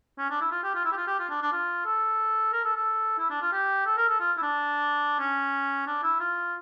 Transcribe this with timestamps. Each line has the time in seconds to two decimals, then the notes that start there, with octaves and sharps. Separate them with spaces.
0.18 C#4
0.30 D4
0.41 E4
0.52 F4
0.63 G4
0.75 F4
0.85 E4
0.92 G4
0.97 F4
1.07 G4
1.20 F4
1.30 D4
1.42 D4
1.52 F4
1.85 A4
2.53 A#4
2.64 A4
2.76 A4
3.19 E4
3.30 D4
3.42 F4
3.52 G4
3.86 A4
3.97 A#4
4.09 A4
4.20 F4
4.37 E4
4.42 D4
5.19 C#4
5.87 D4
6.03 E4
6.20 F4